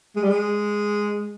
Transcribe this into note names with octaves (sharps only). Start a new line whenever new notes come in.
G#3
G3
G#3